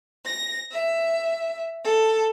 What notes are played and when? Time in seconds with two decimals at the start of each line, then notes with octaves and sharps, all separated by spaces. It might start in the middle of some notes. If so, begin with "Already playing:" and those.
0.24 A#6
0.70 E5
1.83 A4